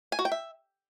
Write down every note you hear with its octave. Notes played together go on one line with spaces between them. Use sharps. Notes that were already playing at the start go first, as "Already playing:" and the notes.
G#5
F#4
G5
E5